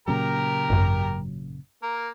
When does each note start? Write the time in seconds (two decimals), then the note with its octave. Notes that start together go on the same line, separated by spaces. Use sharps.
0.08 A#2 C#3 F#3 G4 A#4 A#5
0.70 G#1 F#2
1.83 A#3 A#4